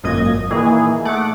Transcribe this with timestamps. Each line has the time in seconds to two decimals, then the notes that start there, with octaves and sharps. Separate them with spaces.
0.03 G#1 F#2 A#2 D#5 G#6
0.50 A#2 D#3 E3 G#4
1.05 A3 F#5 D6